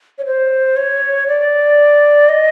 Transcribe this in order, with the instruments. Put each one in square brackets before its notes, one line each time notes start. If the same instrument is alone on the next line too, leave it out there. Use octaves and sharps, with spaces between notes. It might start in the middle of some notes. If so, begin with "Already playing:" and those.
[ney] C#5
C5
C#5
D5
D#5